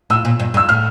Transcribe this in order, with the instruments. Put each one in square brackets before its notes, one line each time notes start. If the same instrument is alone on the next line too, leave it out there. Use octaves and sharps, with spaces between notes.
[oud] A2 [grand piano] E6
[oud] A#2
G2
G2
[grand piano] E6
[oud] A2 [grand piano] F6